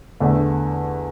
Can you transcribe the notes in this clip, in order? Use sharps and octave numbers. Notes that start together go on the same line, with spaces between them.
E2 D3 A3 D4